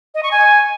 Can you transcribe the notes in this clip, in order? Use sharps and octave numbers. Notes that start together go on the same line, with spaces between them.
D#5
C#6
G#5